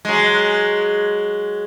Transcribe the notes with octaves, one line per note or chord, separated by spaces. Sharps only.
F#3 G#3